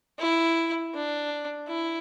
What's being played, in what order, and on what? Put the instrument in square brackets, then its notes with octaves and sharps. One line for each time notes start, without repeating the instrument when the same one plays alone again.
[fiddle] E4
D4
E4